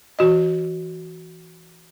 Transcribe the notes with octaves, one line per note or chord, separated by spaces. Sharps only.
E3 F#4 D#5